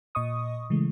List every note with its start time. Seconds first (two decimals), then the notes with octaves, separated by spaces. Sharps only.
0.15 A#2 D#5 C#6 D#6
0.70 C#3 E3 G#3 A3